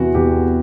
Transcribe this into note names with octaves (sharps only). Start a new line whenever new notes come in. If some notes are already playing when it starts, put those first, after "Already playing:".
Already playing: E2 C3 E3 F#4
E2 G4